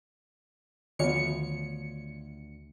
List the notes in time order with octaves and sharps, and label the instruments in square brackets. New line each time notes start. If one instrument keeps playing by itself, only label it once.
[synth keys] D2 C#7 [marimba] D#3 B3 [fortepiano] F3 C#5